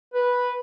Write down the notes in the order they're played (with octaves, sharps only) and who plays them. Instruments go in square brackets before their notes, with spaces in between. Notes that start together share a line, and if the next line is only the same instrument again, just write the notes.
[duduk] B4